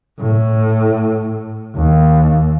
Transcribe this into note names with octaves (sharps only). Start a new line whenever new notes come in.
A2
D#2